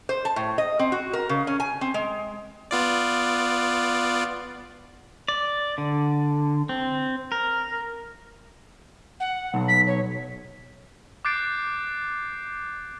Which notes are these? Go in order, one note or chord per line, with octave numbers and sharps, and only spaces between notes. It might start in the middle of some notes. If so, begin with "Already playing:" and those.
C5
A5
A2
D#5
C4
F#4
A#4
C#3
C#4
G#5
C4
G#3
B3 F4 D5
D5
D3
C4
A#4
F#5
B1
B6
C#5
D6 F#6 G6 A6 C7 D7